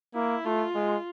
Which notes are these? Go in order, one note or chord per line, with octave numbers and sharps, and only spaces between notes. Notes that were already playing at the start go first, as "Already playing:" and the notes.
A#3 E4
A3 F4
G#3